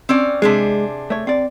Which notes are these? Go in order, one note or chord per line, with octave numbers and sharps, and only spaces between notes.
C4 C#4 D5
C3 G#3 D4 G#4
A3 C#5
C4 D5